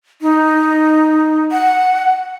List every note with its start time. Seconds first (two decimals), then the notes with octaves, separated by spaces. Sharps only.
0.22 D#4
1.52 F#5